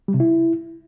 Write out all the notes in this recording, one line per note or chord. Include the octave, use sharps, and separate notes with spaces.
G3
C3
E4